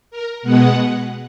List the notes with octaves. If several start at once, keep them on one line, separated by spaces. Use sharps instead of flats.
A#4
B2 G#3 B3 F#5